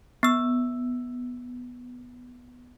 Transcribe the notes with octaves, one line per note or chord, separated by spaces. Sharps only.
B3 E6